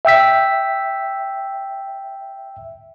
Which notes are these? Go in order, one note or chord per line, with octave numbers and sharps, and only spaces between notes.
E5 G5 E6 B6